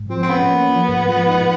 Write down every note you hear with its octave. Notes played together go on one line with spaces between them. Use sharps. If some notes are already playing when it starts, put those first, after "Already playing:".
Already playing: G#2
F3 C4
C4
B3 C#4
A#3
F3
G#2
F3
D#4